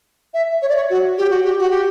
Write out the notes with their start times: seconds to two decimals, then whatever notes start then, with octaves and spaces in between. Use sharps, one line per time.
0.34 E5
0.62 C#5
0.69 D5
0.76 C#5
0.90 F#4
1.18 G4
1.30 F#4
1.44 G4
1.59 F#4
1.70 G4